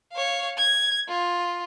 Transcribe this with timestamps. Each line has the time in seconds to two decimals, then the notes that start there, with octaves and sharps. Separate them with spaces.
0.12 C#5 F5
0.57 G#6
1.09 F4